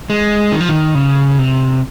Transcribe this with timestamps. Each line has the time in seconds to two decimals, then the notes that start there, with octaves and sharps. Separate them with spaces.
0.10 G#3
0.52 D#3
0.61 F3
0.69 D#3
0.95 C#3
1.38 C3